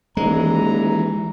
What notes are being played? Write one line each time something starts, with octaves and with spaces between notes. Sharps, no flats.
D#1 E3 G#3 A#5